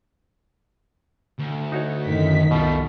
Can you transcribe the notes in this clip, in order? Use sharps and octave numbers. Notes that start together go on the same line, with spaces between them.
D2
D#4 F#4 C#5
F#2 A2 D#3 B6
C2 B2 G3 A3 F4